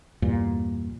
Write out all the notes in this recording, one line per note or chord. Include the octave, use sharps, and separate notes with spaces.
E2 G2 A#2